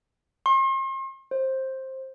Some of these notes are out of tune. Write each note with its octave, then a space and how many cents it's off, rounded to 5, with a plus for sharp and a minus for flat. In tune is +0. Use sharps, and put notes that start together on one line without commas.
C6 +45
C5 +15